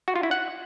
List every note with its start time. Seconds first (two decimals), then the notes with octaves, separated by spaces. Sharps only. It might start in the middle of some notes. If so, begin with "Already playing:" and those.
0.08 F#4
0.16 F4
0.23 E4
0.31 F#5